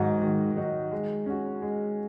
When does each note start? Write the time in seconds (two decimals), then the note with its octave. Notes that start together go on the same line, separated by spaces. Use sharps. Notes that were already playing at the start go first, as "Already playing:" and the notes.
Already playing: G#2 D#3 F#3 D#4 F#4
0.22 D#3
0.56 F#3 D#4 F#4
0.92 G#3
1.26 C#4 F#4
1.62 G#3